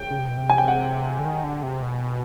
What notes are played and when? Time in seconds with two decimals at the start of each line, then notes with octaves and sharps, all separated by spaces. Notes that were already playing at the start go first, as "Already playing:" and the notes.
Already playing: G5
0.10 C#3
0.19 C3
0.28 B2
0.37 C3
0.50 G#5
0.58 G5
0.68 F#5
1.19 D3
1.25 D#3
1.44 D3
1.63 C3
1.82 B2